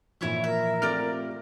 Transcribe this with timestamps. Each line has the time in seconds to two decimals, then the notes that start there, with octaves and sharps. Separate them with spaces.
0.21 A#2 E3 F3 E4 C#5 E5
0.44 A#4 E5
0.82 A3 C4 F4 G4 D5 F6